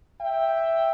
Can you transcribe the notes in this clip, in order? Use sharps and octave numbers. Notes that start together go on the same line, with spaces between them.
E5 G5